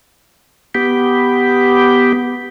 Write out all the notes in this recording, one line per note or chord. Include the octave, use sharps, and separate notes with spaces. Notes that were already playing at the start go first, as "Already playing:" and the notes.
B3 G4